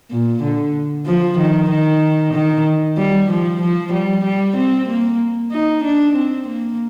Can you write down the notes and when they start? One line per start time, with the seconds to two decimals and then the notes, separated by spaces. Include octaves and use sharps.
0.10 A#2
0.43 D3
1.06 F3
1.38 D#3
1.70 D#3
2.33 D#3
2.97 G3
3.30 F3
3.61 F3
3.93 G3
4.25 G3
4.57 C4
4.88 A#3
5.52 D#4
5.84 D4
6.16 C4
6.48 A#3